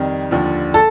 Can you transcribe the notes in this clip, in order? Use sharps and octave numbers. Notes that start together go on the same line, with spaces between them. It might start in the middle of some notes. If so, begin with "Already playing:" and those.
Already playing: F2 D#3 G3
D#2 D3 F3
A4 A5